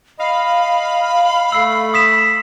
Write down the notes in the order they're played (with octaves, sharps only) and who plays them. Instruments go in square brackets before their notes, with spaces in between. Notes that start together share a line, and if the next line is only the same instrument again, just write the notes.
[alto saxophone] D#5 [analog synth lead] F5 [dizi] B5
[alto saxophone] A3 [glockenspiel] E6 C7
[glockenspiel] D#6 B6 E7